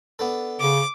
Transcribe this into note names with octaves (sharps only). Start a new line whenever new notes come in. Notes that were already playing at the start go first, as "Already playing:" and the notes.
B3 D4 A4
C#3 D6